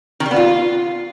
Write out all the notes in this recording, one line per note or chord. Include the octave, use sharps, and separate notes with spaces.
D#3
G3
B3
F4